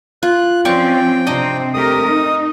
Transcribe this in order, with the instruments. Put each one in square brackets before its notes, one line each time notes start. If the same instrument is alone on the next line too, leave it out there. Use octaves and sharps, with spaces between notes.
[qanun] F4 [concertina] F#6
[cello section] F3 C4 C#4 [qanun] D5 F5 C#6 [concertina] G5
[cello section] C3 C4 [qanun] D4 D#5 A#5
[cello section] A3 G4 A#4 [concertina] D#6
[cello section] D#4